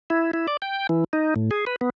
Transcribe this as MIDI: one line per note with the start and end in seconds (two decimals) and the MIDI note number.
0.10 0.31 64
0.33 0.47 64
0.48 0.57 74
0.62 0.87 79
0.89 1.04 52
1.13 1.34 63
1.36 1.50 45
1.51 1.65 68
1.67 1.76 71
1.81 1.90 59